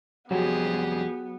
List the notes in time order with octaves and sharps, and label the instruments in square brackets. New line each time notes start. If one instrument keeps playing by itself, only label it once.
[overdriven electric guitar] C2 F2 [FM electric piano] F#3 [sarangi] B3 [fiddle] G4 G#4